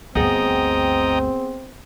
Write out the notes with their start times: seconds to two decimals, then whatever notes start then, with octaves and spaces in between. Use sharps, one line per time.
0.15 G1 D2 B3 C4 G#4 D#5 G5 A#5